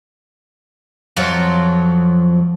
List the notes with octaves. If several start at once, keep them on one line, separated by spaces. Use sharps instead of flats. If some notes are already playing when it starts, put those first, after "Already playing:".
F2 F3 F#3